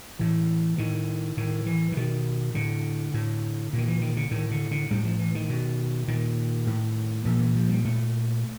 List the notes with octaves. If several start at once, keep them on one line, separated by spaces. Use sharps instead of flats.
A2 E3
A2 D#3
A2 D#3
E3
E3
B2 D#3
A2 D3
A2
A#2
D#3
E3
D#3
D3
A2 D#3
D3
D3
A2 G3
F3
E3
D#3
B2
A#2 D#3
A2
A#2 F3
E3
F3
G3
A#2 A3